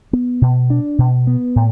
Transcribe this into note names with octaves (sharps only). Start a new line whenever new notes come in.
B3
B2
D4
B2
B3
A2